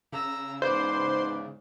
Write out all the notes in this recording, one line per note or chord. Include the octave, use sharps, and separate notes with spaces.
C#3 A#5 E6
E2 G#2 D#4 B4 C5 D5